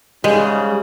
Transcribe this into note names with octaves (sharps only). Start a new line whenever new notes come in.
G#2 C#3 G3 G#3